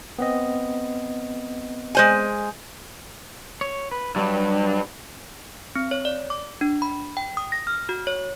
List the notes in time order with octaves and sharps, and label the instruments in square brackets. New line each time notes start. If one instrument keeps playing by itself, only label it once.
[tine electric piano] B3 C4 D#5
[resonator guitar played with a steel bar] G#3 C5 G#5
[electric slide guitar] C#5
B4
[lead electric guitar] G2 [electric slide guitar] F#3 G3
[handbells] C4
C#5
D5
D6
D4
B5
G5
D#6
A#6
F6
F#4
C#5